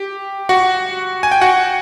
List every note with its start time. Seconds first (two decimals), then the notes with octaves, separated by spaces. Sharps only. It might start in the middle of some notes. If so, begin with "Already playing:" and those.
Already playing: G4
0.49 F#4 F#5
1.23 G#5
1.32 G5
1.41 F#4 F#5